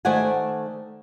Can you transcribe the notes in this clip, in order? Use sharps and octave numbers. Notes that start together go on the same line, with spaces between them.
D#3 A3 C5 D5 F#5 G#5